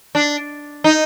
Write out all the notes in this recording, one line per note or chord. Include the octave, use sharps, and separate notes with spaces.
D4
D#4